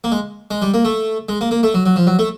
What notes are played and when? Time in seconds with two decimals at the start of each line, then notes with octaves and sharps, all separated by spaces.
0.04 A#3
0.12 G#3
0.51 G#3
0.62 G3
0.74 A#3
0.85 A3
1.29 G#3
1.41 A#3
1.51 A#3
1.63 A3
1.74 F#3
1.86 F#3
1.96 F3
2.07 F#3
2.19 A3